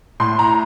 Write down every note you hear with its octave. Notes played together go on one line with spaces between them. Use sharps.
A2 C6
A#5